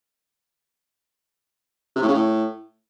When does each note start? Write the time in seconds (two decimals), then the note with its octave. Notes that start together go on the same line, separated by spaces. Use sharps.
1.96 C3
2.02 A2
2.08 C#3
2.14 A2